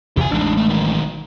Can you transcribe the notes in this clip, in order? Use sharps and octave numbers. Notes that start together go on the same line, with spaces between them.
E2 C3 G4 G#5
A1 G#3 D4 D#4
A3
D#3 F#3